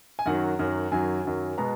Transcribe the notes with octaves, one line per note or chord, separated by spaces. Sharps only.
G#5
F#2 D#3 F#3 F#5
F#2 D#3 F#3
F#2 D#3 F#3 G#5
F#2 D#3 F#3
B2 G#3 B3 A#5